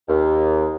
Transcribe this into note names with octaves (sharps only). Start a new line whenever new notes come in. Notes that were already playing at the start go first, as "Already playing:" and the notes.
D#2